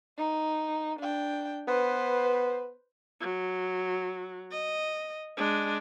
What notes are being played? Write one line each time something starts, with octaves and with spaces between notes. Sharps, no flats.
D#4
D4 G5
B3 B4 C5
F#3
D#5
G#3 D4